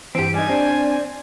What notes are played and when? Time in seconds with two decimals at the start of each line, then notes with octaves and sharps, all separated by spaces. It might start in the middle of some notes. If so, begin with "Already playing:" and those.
0.15 G2 E3 C4 G4 D7
0.34 G3 D#4 G#5
0.49 C4 D4 D5